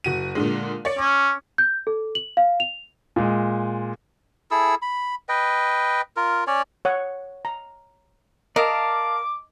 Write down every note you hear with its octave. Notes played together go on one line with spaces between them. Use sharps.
F#1 F#4 D#7
A#2 D3 G#3
C#5 D5 C#7
C#4 D6
G6
A4
F#7
F5
F7
A#2 G#3
E4 G#4 A4 E6
B5
B4 D#5 G5
F4 A#4
C#4 C#5 D5
C#5 F#5
A#5
A#4 D5 D#5 F5 A5 D6